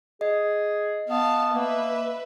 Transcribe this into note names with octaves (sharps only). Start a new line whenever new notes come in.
G#4 D#5
B3 F5 A5
A#3 B4 E5